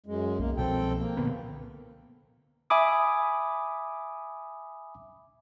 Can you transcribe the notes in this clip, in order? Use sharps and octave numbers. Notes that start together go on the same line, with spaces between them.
F#2 G#3
B1 A#3
C2 B2 F3 C4 A4 G5
A#3
A#2 D3 B3
E5 G#5 B5 D6 D#6